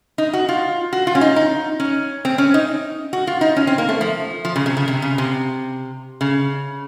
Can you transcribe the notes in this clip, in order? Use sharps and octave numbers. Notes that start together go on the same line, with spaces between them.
D#4
F#4
F4
F#4
F4
C#4
D#4
D#4
C#4
C4
C#4
D#4
F#4
F4
D#4
C#4
C4
A#3
A3
F3
F3
C#3
C3
C#3
C3
C#3
C3
C#3